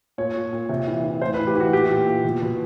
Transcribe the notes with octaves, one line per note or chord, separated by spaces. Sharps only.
A#2 C#5
A#2
A#2
C3
E3
E3
A2 C5
B4
E3
G4
E3 F#4
A#2 G4
A#2
A#2
B2
B2